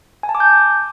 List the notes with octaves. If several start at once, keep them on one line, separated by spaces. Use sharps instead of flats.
G#5
A5
D6
G6